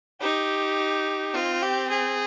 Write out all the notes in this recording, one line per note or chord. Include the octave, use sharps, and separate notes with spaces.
D#4 G4
C4 F4
G4
G#4